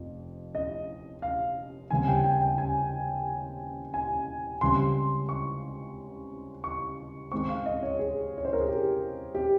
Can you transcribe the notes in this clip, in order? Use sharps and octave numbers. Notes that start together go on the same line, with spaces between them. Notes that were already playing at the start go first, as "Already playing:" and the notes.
Already playing: F1 F2
D#5
F5
D#2 C#3 G3 C4 G#5
G5
G5
G5
G#5
G#5
C#2 C#3 G3 C4 C6
C#6
C#6
G#2 D#3 G#3 C4 C#6
F5
D#5
C#5
G#4
C#5
C5
A#4
G#4
G4
G4